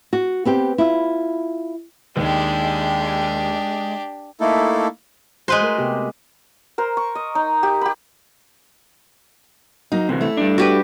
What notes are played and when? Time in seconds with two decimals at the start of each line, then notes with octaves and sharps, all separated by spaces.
0.13 F#4
0.45 B3 C4 G4
0.78 E4 F4
2.17 D#2 G#3 D4 G4
4.40 A3 A#3 D#4 E4 A4
5.48 G#3 F#4 B4 C5
5.61 A3 A#4
5.78 C3 B3 G4
6.78 A#4 C5
6.97 C#6
7.15 D#5
7.35 D#4
7.63 G4
7.81 G4 B5
9.92 F#3 A#3 D#4
10.09 D2 C3 E3
10.21 A3 E4
10.37 G3 D4
10.58 F#4 G4 B4